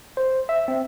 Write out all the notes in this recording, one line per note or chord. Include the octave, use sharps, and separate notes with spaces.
C5
E5
C4